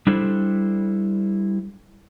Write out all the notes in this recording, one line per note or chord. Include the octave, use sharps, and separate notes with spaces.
G3 D4 E4 A4 C5